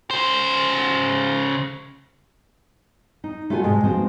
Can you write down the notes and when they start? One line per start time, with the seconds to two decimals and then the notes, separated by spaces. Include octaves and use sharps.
0.11 C#3 C5
3.24 D#4
3.50 A3 F4 F#4 A4 G#5
3.63 G#2 C3 G#3 D#5 A5
3.84 F3 G#3 B3 C4 D#4 F#4